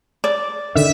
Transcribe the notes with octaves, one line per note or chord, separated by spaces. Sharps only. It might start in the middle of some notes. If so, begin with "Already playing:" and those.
D5
D3 D#3 E5